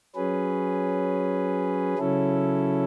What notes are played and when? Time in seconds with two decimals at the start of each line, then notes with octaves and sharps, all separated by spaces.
0.15 F#3 C#4 G#4 B4
1.99 C#3 F#3 C#4 E4 A4